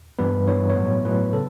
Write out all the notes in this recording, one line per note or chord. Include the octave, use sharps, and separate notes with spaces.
G2 E3 G3 B3 B4
G2 E3 G3 B3 C#5
C#5
A2 F#3 B3
A2 F#3 B3 B4
C#3 A4